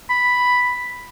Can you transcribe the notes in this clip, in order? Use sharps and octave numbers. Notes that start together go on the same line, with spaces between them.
B5